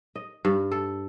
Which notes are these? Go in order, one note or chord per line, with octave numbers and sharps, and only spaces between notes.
D#5
G2
A4